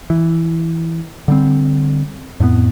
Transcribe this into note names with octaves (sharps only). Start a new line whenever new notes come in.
E3
D3 G3 C4
F2 A2 A3 B3